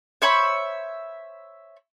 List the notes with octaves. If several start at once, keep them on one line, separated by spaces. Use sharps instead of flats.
C5 C#5 E5 B5